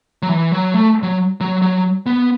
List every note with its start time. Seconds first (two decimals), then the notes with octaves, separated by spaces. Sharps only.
0.23 F#3
0.29 E3
0.52 F#3
0.74 A3
1.03 F#3
1.41 F#3
1.62 F#3
2.06 B3